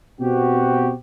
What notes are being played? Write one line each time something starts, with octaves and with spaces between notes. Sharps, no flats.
B2 C4 F#4 G4